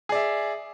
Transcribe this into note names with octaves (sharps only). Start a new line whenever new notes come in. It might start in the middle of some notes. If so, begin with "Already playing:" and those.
G#4 D5 E5